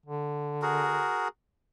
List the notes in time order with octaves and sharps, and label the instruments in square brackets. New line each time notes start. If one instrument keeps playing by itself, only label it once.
[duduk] D3
[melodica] F#4 G#4 A#4